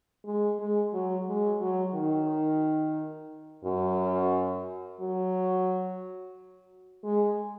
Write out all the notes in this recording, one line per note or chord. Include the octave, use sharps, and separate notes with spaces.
G#3
G#3
F#3
G#3
F#3
D#3
F#2
F#3
G#3